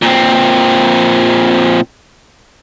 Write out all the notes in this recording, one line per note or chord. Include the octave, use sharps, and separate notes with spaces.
A#2 C4